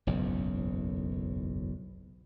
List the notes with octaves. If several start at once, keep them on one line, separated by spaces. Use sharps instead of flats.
F#1 B1 E2 G#2